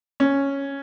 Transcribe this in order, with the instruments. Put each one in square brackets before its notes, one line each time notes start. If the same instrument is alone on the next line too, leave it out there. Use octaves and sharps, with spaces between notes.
[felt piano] C#4